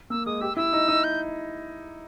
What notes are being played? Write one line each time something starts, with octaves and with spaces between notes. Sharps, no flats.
A#3 E6
G#3 D#6
G4 E6
E4 E6
D#4
D#4
G6